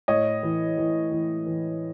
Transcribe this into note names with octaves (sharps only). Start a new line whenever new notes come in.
A2 C#5 D#5
E3
E3
E3
E3